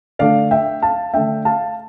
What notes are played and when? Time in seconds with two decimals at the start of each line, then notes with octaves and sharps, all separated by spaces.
0.19 D3 A3 D4 D5 F5
0.51 E5 G5
0.82 F5 A5
1.13 D3 A3 D4 E5 G5
1.45 F5 A5